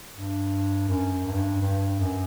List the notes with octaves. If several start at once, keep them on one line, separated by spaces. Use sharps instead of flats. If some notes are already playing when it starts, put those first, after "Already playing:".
G2
F#2
G2
G2
F#2